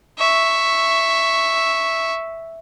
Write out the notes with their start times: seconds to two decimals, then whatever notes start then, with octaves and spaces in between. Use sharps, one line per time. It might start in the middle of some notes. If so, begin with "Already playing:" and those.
0.18 E5 C#6